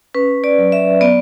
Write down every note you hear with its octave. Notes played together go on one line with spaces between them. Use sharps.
C#4 B4
D5
F#3
E5
B3 D5